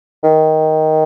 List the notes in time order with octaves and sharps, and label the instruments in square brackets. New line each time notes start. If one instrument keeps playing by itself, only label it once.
[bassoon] D#3